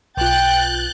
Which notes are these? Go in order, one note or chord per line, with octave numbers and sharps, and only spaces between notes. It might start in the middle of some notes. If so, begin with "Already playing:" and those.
B1 F4 G5 F#6 G6 A6